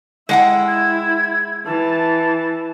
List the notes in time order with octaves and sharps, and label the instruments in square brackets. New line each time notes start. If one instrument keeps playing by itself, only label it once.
[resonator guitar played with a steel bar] G#3 F#5 G5 [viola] E4
[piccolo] G#6
[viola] E3 [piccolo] A5